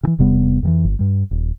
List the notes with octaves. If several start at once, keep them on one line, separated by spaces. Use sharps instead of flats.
C#3 E3
E1 C3 G3 B3
F2 D#3 E3
G1
G2 G3
D#1